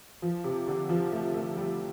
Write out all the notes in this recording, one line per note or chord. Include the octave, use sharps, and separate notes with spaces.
F3
C3
D3
F3
A3
A3
G3